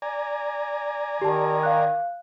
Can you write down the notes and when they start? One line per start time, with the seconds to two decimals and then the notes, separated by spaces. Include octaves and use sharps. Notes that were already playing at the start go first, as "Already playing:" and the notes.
0.02 D5 G#5 A#5
1.22 D#3 G4 A5
1.63 F5 F#6